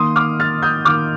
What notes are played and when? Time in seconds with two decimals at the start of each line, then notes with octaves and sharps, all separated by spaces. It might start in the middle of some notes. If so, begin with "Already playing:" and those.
Already playing: D#3 A#3 C6 D#6
0.16 D6 F6
0.40 F6 A6
0.62 D#6 G6
0.85 D#3 A#3 D6 F6